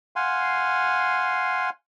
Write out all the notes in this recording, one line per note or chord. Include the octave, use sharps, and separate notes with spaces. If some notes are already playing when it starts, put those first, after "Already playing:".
F5 F#5 G#5 C6